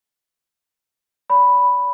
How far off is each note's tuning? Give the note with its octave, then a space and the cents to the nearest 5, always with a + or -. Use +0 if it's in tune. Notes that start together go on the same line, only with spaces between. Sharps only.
D5 -40 B5 +0